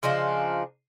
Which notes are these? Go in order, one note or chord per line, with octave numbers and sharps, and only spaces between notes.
C#3 F3 D4 D#4